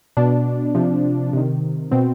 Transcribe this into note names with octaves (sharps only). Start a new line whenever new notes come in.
B2 D4
C3 F3
C3 D#3
B2 C4